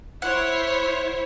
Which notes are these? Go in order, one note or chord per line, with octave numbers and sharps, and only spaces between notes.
E4 C5 C#5 F#5